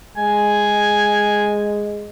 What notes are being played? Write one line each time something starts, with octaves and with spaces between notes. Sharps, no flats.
G#3 G#5